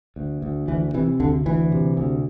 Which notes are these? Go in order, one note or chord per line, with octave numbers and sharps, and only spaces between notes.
D2
D2
D2 E3
C3 E3
D2 D3
D2 E3
C3
D2